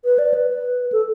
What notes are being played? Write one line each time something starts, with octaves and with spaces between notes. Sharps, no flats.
B4
D5
B4
A4